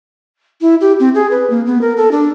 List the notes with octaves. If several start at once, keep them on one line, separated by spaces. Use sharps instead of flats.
E4
G4
C4
G#4
B4
A#3
B3
A#4
A4
D4